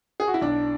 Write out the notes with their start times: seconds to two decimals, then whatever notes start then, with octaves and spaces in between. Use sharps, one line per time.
0.20 G#4
0.27 F#4
0.34 E4
0.41 B1 D4